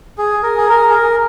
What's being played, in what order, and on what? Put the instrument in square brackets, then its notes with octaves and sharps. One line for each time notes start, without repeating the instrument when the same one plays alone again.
[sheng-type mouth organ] G#4
A#4
G#4
A#4
G#4
A#4